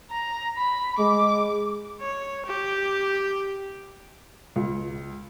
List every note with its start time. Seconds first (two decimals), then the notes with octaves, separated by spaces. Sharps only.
0.11 A#5
0.57 B5
0.99 G#3 D6
2.01 C#5
2.46 G4
4.56 C#2